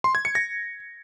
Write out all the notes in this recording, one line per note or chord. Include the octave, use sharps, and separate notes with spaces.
C6
G#6
C#7
A#6